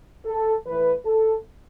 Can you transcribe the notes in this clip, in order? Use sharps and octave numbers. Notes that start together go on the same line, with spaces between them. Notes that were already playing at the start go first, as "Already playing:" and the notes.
A4
A2 E3 B4
A4